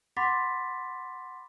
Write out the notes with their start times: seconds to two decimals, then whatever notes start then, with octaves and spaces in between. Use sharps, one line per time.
0.17 F#5 B5 C6 D6 A6 B6